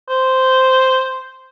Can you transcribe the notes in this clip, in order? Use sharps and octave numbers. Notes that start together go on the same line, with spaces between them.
C5